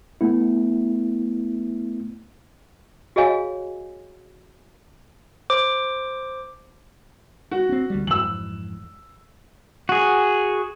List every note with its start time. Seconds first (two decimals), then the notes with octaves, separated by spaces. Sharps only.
0.21 A3 B3 E4
3.16 F#4 G#4 C#5 D#5 F5 G#5
5.50 C5 D6
7.51 F#4
7.69 C4 C#4
7.90 D2 G3
8.07 F2 G#2 E3 E6 F#7
9.89 F#4 G#4